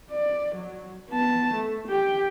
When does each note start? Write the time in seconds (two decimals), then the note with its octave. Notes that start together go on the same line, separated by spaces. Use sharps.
0.11 D5
0.55 F#3
1.09 B3 A5
1.53 A3
1.87 G4 G5